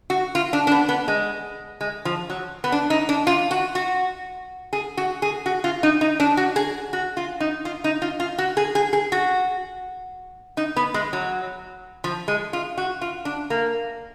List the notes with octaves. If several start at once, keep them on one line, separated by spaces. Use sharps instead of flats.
F#4
F4
D4
D4
B3
B3
G#3
G#3
F3
F#3
B3
D4
D#4
D4
F4
F#4
F#4
G#4
F#4
G#4
F#4
F4
D#4
D#4
D4
F#4
G#4
F#4
F4
D#4
F4
D#4
F4
F4
F#4
G#4
G#4
G#4
F#4
D#4
B3
G#3
F#3
F3
G#3
F4
F#4
F4
D4
A#3